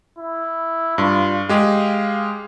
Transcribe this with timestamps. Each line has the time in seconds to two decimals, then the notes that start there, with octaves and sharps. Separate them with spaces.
0.19 E4
0.98 G2 F4
1.49 G#3 G4 G#4 F5